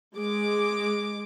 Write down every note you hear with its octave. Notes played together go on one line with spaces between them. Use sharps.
G#3 D6